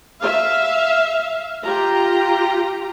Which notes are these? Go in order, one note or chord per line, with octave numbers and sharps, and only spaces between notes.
E5 F5
F4 G4 A#5